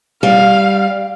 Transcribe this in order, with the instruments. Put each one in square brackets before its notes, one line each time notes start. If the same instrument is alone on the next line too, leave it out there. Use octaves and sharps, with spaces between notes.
[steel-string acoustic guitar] G3 [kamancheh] F5